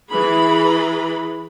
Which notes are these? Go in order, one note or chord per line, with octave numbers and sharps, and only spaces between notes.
E3 G#4 B4 B5